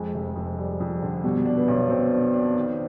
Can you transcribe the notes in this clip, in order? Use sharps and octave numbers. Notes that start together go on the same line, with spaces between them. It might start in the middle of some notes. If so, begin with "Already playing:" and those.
Already playing: F2 G#3
F1
F2
G3
F2
D3
B2 G3
D4
B3
B1
B2 C4
D4
D4
D#3